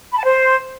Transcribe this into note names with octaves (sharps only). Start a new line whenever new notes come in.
B5
A5
C5